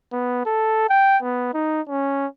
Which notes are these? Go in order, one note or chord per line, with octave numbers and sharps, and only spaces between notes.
B3
A4
G5
B3
D#4
C#4